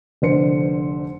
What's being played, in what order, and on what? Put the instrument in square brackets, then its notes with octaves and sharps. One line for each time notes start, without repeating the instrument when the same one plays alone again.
[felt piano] F1 D3 C5 C#7